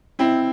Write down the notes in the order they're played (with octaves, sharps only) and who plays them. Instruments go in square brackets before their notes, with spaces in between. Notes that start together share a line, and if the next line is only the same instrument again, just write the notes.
[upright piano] C4 E4